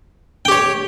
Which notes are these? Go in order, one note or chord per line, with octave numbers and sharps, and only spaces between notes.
G4 C#5 G5